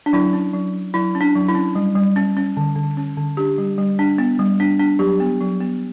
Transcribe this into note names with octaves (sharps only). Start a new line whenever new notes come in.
D4
F#3 E4
C#4
F#3
F#3
F#3 E4
C#4
D4
F#3
E4
C#4
G3
G3
C#4
C#4
D3
D3
C#4
D3
D4 G4
G3
G3
D4
B3
G3
D4
D4
F#3 G4
B3
F#3
B3